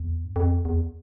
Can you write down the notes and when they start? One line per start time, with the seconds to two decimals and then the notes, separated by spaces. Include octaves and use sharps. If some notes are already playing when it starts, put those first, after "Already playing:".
Already playing: E2
0.25 G2
0.36 F2
0.65 E2